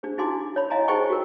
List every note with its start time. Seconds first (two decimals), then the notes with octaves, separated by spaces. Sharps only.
0.03 D4 G#4 C5
0.18 D#4 E4 F#4 G#5 C6 D6
0.56 C#5 B5
0.70 E4 D#5 F5 G#5 A#5 C6
0.88 D#4 G#4 C5 G5 G#5 C#6
1.10 F#4 G4 A#4